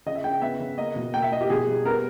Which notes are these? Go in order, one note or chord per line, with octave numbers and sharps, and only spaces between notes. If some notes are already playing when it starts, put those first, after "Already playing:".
C#3 D#5
E5
C#3 G5
B3 E5
C#3
A#3 D#5
B2
A#3 G5
E5
A#3 D#5
G4
B2 G#4
G3
B3 A#4